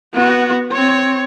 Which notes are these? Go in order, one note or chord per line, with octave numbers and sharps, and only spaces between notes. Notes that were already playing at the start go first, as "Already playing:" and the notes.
B3 F#4
C4 C#5